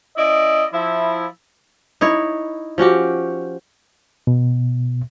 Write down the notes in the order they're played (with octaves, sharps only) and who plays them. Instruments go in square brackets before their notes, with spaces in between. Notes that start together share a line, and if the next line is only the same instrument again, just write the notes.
[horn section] C#4 E4 D5 D#5
F3 E4
[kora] D#4 E4 C#5
F3 C#4 F#4 G4
[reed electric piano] B2